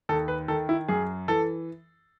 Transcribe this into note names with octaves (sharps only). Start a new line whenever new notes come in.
D#2 A4
B4
D#3 A4
E4
F#2 G#4
E3 A4